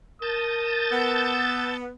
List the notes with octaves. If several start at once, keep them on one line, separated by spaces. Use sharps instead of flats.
A#4 A5 D#6 G6 A6
B3 E6